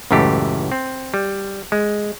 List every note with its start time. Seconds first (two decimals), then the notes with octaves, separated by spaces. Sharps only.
0.11 C#2 F#2 A2 E3 A3 G4
0.72 C4
1.14 G3
1.72 G#3